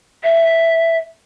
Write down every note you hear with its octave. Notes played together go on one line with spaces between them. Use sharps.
E5